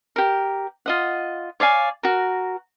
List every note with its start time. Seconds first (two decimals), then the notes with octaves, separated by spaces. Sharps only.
0.16 G4 A#4
0.86 F4 D#5 F#5
1.60 C#5 D5 F5 G#5
2.03 F#4 A#4